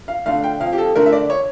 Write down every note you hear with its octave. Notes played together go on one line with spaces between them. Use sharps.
F5
D3 A3 D4 F5
G5
F2 F5
G4
A4
D3 A3 D4 A#4
E5
D5
C#5